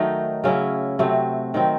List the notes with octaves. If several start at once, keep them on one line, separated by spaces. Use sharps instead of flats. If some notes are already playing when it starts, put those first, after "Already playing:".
Already playing: D#3 F#3 A3 D#4
C#3 F#3 C#4 E4
C3 F#3 A3 C4
D#3 F#3 C4